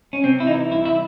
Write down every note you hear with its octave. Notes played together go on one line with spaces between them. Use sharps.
C#4
C3 C4
E4
E3 D#4
C2 E4
E4